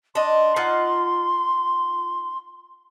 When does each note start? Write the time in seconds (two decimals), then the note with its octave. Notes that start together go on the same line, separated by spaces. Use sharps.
0.15 D4 D#5 C6
0.56 D#4 F4 F#5